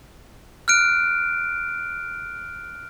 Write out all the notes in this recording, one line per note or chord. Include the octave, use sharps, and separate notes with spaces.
F6 F#6 D7